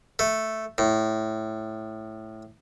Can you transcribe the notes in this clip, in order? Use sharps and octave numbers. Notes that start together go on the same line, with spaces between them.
A3
A2